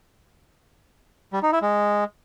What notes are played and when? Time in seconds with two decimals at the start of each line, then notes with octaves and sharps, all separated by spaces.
1.33 G3
1.43 D#4
1.52 E4
1.62 G#3